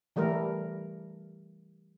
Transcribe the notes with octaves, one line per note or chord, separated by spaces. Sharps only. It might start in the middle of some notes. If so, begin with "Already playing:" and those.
E3 G3 A3 A#4